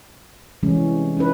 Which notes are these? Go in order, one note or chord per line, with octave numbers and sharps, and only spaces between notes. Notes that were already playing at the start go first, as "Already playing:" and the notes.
C3 E3 G3 G#3 C#4
C#4 D#4 E4 B4